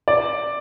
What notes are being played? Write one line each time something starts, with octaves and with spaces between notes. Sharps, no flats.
D5